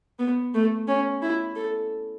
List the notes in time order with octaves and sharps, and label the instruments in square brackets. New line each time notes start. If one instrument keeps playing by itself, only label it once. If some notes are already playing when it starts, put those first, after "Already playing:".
[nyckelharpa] B3
A3
C#4
E4
A4